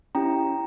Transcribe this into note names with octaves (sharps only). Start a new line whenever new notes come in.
C#4 E4 G4 G5 A#5